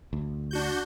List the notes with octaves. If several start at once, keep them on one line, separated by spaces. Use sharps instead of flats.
D2
D4 F#4 G6